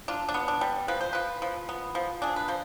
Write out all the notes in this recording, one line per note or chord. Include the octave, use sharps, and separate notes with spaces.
D4 F4
D4
B3
D4
G3
F3 B4
C5
F3 B4
F3
B3
F3
D4 G#4
B4
F3 C5